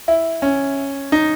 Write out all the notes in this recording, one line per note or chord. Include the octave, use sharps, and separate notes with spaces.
E4
C#4
D#4